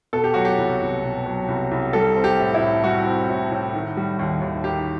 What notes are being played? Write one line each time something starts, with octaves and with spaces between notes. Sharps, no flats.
B2 A4
G4
F#3 F#4
G4
C2
C2
B2
F#3
C2
C2
G3 A4
C4
G4
A2
E4
A2
G3 F#4
C4
A2
A2
D#3
G3
D#2
D#2
D#3 G4